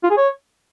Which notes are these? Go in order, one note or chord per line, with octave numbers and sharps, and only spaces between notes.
F4
G#4
C#5